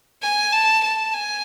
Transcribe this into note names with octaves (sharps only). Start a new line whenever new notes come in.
G#5
A5
A5
G#5